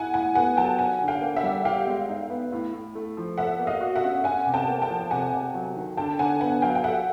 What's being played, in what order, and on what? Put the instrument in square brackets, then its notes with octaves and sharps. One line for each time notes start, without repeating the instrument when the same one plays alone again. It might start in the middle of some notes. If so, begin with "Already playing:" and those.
Already playing: [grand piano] E4 [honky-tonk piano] F#5 G#5
[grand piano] A2 [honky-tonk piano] F#5 G#5
[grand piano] B3 [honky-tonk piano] F#5 G#5
[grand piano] F#3 [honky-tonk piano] G5 A5
[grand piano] D#4 [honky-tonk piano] F#5 G#5
[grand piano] D3
[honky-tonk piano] F5 G5
[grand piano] A#3
[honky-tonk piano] E5 F#5
[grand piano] G3
[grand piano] G4 [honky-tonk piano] F5 G5
[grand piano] G#3
D#4
B3
A2
A2
A3
F3
[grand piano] A4 [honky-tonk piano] E5 F#5
[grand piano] A#3
[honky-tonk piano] D#5 F5
[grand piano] F#4
[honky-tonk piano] E5 F#5
[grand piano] C#4
[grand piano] C#4 [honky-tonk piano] F#5 G#5
[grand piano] C3
[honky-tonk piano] G5 A5
[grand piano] A#3
[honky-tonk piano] G5 A5
[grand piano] F3
[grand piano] C3 [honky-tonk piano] F#5 G#5
[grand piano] C3
F#3
D#3
[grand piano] D3 [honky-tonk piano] G5 A5
[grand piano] D3 [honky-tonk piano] F#5 G#5
[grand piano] B3 [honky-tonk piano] F#5 G#5
[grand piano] F#3 [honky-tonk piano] F5 G5
[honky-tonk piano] G5
[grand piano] A4 [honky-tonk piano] E5 F#5